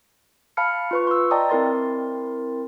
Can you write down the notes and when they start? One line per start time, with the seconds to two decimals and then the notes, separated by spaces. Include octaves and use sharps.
0.57 F5 A5 B5 F6 C#7
0.91 F4 B4 C#6
1.07 C6 E6
1.31 D5 D#5 G5 A5 A#5 D#6
1.49 C4 E4 A#4 C6 A6